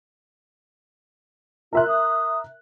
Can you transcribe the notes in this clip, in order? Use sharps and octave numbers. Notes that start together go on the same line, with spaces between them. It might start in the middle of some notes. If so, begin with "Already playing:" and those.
F4 A#4 E5 F#6
D#6